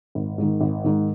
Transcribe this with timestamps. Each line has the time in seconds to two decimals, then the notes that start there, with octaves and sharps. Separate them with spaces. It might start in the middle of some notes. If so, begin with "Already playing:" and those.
0.15 G#1
0.38 G#2 D#3
0.61 G#1
0.84 G#2 D#3